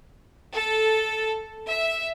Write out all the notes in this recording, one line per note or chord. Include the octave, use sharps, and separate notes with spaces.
A4
E5